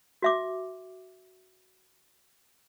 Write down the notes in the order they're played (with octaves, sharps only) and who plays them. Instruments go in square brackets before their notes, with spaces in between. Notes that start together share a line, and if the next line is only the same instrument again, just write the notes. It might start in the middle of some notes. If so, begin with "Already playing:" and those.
[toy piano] F#4 E5 D6